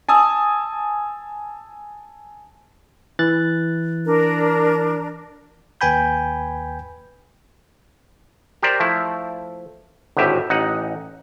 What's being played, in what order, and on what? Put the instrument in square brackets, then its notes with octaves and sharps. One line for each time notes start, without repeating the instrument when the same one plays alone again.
[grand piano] G#5 A5 D#6 E6
[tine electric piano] E3 F#6 A6
[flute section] D4 A#4
[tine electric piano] D#2 B4 G5 G#5 B5 G6
[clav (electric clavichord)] G4 A#4 C5 D5
F3 A3 E4
G#1 D2 A2 G4 E5
A1 D#4 F#5